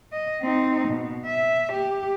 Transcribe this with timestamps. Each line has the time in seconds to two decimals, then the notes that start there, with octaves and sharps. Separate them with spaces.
0.12 D#5
0.41 C4 D#4
0.88 B2
1.26 E5
1.72 G4